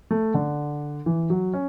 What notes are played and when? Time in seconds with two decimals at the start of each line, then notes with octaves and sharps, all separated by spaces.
0.11 A3
0.34 D3
1.06 E3
1.30 F#3
1.53 C#4